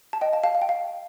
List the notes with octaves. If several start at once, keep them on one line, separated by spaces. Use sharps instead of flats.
A5
D#5 G5
F5 A5
F5 A5
F5
G5
F5